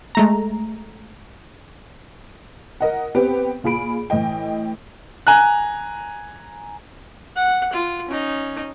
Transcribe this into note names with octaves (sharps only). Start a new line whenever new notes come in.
G#3 A3 A#5
A#4 D#5 F#5
B3 C4 G4 B4 G5
A#2 F4 G#4 B5 D7
A2 E3 D#5 G5
G#5 A#5 F#6
F#5
F4
C#4 D#4